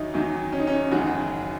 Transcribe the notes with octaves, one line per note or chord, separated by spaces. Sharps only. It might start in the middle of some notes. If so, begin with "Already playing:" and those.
Already playing: E2 D#3 F#3 D#4 E4
E2 D#3 F#3
C#4
D#4
C#4
F#1 E2 D#3 F#3 F#4